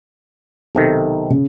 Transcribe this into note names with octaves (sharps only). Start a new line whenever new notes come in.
B1 C3 D#3 A4
C#3